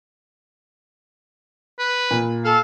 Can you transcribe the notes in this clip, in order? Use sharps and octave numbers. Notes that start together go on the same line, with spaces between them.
B4
A#2
A4 F5